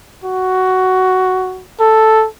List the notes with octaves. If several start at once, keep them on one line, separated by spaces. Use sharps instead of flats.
F#4
A4